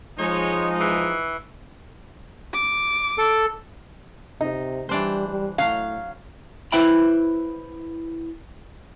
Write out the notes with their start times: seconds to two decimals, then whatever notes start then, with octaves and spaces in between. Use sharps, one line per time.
0.19 F3 G#3 D#4 C#5
0.80 E3
2.54 D6
3.18 A4
4.41 C3 D#4
4.89 E3 G3 D4 C5
5.28 G3
5.58 A2 F#3 F5
6.72 E4 B4 C5 E5 G5 B5